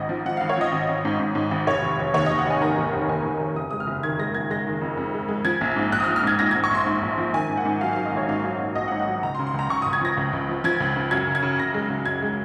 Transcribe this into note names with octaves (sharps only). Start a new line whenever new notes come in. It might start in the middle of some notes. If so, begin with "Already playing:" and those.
Already playing: G#1 G#2 D#5
F3
F3 F#5
G#1 F5
C#5
F3 D#5
G#1
G#1
G#2
G#2
G#2
G#1
F1 C#5
F1
F1
D#2 C#5
D#2 D#5
F#5
F1 G#5
D#3 A#5
D#2
F1
D#3 G#5
F1
F1
F#1 D#6
G#3 D#6
F6
F#1
D#3 G#6
G#3 A#6
F#1 G#6
G#3 A#6
D#3
F2
F2
G#3
G#3
F3 G#6
A#1
G#2
A#1 F#6
D#6
F6
F3
F6
G#2 G#6
G#2 A#6
G#2 G#6
C#6
A#1 C6
G#2
A#1
F3
D#3 G#5
G#2
F#5
G#2
F#3 F5
F#3 F5
D#5
A#1 C#5
G#2 F5
F#3
G#2
A#1 D#5
F#5
G#2
F#5
F#3
C#2 A#5
C6
C#3
C6
C#2 A#5
C#2 C#6
C#2 D#6
G#6
F3 A#6
C#2
C#2
F3
F3 G#6
C#2
C#3
F#2 G#6
C#3
G#6
C#3
C#3 A#6
G#3
C#3
F#2 G#6
G#3